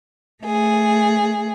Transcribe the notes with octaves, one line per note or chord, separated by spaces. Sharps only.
A3 G#4